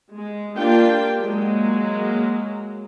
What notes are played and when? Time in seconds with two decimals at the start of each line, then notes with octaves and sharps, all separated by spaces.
0.13 G#3
0.56 A#3 D4 F4 G4 G5
1.17 F#3 G#3 A#3